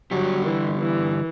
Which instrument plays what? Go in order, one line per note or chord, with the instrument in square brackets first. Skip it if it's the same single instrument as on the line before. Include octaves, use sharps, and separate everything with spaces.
[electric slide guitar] D3 G3 D4 G4 [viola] F#3
[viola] E3
E3